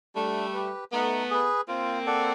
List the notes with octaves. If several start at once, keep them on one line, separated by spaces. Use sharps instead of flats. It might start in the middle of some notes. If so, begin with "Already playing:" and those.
G3 A3 D4
G4 B4
A3 B3 D#4
G#4 B4
A#3 C4 F4
A4 D5 F#5